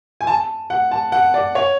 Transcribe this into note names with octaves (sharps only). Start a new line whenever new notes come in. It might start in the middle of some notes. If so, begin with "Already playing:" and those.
G#5
A5
F#5
A5
F#5
D5
C#5